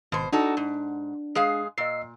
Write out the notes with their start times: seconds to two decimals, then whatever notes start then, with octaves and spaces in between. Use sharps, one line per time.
0.12 G#1 B2 C5 C6
0.32 D4 D#4 F#4 A4
0.57 G#2
1.35 G#3 G#4 F5
1.78 A#2 D#5 E6 C7